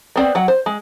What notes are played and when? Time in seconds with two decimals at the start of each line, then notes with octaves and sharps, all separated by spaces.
0.16 B3 C4 D5
0.35 F#3 F#5
0.48 C5
0.66 G#3